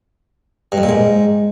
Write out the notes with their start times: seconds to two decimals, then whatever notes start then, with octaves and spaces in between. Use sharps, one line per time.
0.72 G2
0.78 F2
0.83 A#2
0.89 G#2